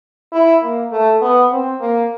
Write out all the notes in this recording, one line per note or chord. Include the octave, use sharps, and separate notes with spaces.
E4
A#3
A3
B3
C4
A#3